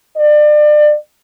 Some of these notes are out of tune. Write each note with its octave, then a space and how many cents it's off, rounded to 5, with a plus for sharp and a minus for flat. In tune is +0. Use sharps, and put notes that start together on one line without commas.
D5 +30